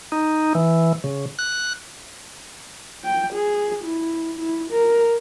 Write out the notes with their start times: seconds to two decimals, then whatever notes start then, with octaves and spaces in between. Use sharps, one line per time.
0.12 D#4
0.55 E3
1.04 C#3
1.39 F#6
3.04 G5
3.33 G#4
3.84 E4
4.39 E4
4.71 A#4